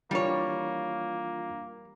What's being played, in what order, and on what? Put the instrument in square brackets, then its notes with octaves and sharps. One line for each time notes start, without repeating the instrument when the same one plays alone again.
[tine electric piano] E3 D4 F4 [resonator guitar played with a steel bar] G3 C#5 [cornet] A#3